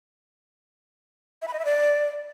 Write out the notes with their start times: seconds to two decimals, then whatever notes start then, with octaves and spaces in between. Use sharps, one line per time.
1.42 E5
1.48 B5
1.53 D#5
1.59 E5
1.65 D5